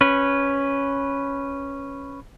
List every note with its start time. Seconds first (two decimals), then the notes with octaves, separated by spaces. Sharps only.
0.01 C#4 B4